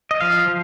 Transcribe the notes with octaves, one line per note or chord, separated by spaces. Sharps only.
D#5
F3 F5
F3